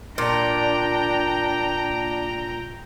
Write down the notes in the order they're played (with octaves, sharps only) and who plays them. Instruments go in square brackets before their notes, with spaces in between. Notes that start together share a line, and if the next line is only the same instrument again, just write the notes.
[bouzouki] A#2 [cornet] D4 [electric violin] G5 A#5